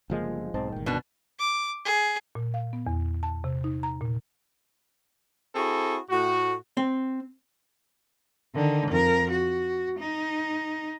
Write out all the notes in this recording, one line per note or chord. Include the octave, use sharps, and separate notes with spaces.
G1 C#3 F3 G#3 A#3
B1 G#2 C4 C5 D#5 A5
G1 A#2 D#3 G#3 G5
B2 D4 B4
D6
G#4
A#2
F5
B3
E2
A5
C3
D#4
A#5
A#2
C4 E4 F#4 G#4 A4
A2 F#4
C4
D3 D#3
F2 A#4
F#4
D#4